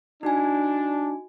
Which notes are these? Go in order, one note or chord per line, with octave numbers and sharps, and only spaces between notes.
D4 D#4 F#4 G#5